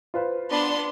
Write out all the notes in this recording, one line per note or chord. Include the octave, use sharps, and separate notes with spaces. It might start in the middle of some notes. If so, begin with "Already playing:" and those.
F4 B4 C5
B3 D4 C6